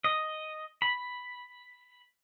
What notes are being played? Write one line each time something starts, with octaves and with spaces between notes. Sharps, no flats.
D#5
B5